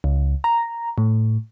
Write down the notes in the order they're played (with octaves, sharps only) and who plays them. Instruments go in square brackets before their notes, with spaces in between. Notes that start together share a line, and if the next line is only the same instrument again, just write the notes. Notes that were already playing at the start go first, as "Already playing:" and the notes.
[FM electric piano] C#2
A#5
A2